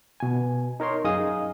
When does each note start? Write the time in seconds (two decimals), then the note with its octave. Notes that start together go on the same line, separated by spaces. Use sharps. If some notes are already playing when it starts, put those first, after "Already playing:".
0.20 B2 G#5
0.80 D#4 A#4 C#5 C6
1.04 F#2 D#4 G#4 D#5 F5 D#6